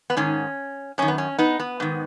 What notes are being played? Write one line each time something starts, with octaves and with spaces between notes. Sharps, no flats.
B3
G#2 D#3 C#4
F#2 D#3 C#4
B3
C#4
B3 D#4
B3
G#2 D#3